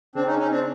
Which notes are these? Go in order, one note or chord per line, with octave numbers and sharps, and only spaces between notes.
C#3 C4 D4
C#4 D#4
C#4 D#4
C4 D4